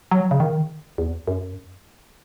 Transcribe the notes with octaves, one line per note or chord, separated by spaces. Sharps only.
F#3
C#3
D#3
E2
F#2